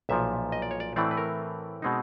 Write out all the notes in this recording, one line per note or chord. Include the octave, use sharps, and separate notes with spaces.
B1 A#2 F3 E5
D#5
D5
C#5
D5
A2 E3 A3 C4 D5
B4
A#4
B2 G#3 C4 D#4